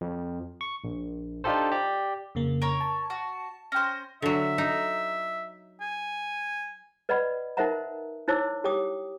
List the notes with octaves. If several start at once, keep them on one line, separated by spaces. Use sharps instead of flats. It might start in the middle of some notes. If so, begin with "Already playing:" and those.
F2
C#6
A#1
D4 D#4 F4 G4 A4 C5
G4 D5
F2 C#3 A#3
A#4 C#5
A5
F#4
C#4 C5 G5 A#6
D3 F#3 E5
D#4
G#5
B4 D5 D#5 F#5 B5
D#4 A#4 C5 E5 F#5 A#5
D#4 E4 C5 C#5 D6 E6
G4 C#5 G5 D6 D#6